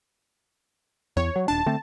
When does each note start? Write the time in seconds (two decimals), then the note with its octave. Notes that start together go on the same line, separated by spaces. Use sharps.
1.17 E2 C#5
1.36 F#3
1.48 D#1 D4 A5
1.66 D3 A3 C4